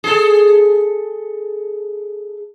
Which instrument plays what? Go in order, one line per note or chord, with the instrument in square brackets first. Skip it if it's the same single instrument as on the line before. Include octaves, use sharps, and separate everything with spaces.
[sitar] G#4 A4